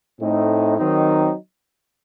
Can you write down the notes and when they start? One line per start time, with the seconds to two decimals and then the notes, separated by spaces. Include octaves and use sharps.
0.20 A2 A3 C4 D#4
0.77 D#3 F#3 C4 D#4